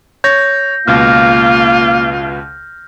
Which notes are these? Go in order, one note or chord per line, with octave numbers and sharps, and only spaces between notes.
C#5 G6 A#6
C#2 B2 A#3 F4 F6